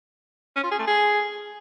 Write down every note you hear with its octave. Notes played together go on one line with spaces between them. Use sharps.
C#4
F4
G#4
A3
G#4